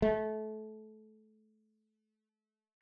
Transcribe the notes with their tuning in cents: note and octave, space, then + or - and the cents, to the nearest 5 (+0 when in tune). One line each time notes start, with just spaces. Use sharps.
A3 -25